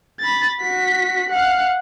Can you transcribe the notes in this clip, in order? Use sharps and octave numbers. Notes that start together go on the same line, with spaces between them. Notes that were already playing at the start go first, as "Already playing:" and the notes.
B5 A6
F#4 B6
F5 F#5